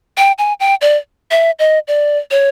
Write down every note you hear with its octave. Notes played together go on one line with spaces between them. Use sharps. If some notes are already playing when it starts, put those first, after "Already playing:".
G5
G#5
G5
D5
E5
D#5
D5
C#5